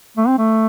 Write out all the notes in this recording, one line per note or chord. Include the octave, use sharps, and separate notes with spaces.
A3
C4
A3